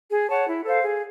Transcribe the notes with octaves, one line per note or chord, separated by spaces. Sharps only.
G#4
C#5 F#5 A5
E4
A4 C5 F5
G#4